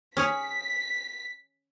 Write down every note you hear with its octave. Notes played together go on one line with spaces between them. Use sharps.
C#4 G#4 C#5 B6